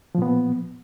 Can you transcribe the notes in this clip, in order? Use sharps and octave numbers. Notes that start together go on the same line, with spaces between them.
A#2 F3 B3